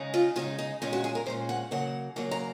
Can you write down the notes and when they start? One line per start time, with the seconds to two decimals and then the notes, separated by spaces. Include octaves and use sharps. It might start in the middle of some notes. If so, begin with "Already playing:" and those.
Already playing: C#3 G#3 D#4
0.14 F4
0.36 C#3 G#3 D#4 F4
0.59 D#4
0.82 A#2 G#3 C#4 D#4
0.93 F#4
1.04 G#4
1.15 A#4
1.26 A#2 G#3 C#4 C5
1.49 F#5
1.71 C#3 F#3 A#3 F#5
2.16 C#3 F#3 A#3 F#5
2.31 A#5